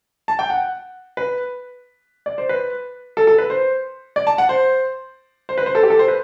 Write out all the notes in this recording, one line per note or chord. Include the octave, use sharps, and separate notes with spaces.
A5
G5
F#5
B4
D5
C5
B4
A4
A4
B4
C5
D5
A5
F#5
C5
C5
B4
C5
A4
G4
A4
C5
B4